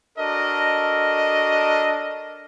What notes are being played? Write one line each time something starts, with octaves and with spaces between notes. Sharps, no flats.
D4 F#4 A4 A#4 D#5